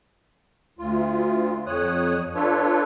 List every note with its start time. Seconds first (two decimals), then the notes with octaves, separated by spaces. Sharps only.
0.79 D2 F4
1.67 F2 C#5 D#6 F#6
2.35 D4 F4 A4 B4 C#5